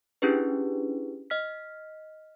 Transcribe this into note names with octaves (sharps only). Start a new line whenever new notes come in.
C#4 D4 E4 G4 G#4 B4
D#5 F6 B6